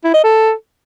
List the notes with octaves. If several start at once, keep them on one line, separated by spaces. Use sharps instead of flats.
E4
D#5
A4